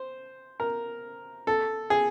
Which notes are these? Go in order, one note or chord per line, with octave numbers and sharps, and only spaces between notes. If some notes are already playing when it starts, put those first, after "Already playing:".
Already playing: C5
A#4
A4
G#4